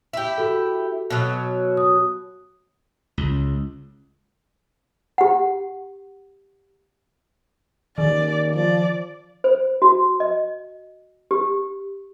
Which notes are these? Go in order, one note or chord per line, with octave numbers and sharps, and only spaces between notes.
E4 G4
F#4 A4
B2 F#3
D#6
C#2
G4 F#5
D#2 D#3 D5
F3 D5
C5
F#4
D#5
G4